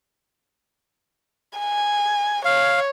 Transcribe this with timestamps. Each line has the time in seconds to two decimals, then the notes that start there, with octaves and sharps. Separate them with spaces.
1.58 G#5
2.45 C#5 F5